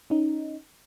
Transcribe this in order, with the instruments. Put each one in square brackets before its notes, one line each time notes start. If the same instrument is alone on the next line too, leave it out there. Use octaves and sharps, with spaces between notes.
[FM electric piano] C#4 D#4